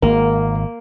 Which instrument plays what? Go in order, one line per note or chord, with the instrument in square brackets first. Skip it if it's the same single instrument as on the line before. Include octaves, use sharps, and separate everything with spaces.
[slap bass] G#1 [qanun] A#3 [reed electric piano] A#4